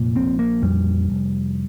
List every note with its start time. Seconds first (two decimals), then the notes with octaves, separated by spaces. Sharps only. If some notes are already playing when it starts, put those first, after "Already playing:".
Already playing: F1 A#2
0.16 A#1 C4
0.39 A#3
0.62 F2 G3
1.10 F1